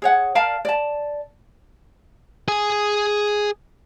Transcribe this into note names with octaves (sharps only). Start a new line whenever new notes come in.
G#4 C#5 F#5
A#4 D5 F5 A5
D5 A5
G#4 G#5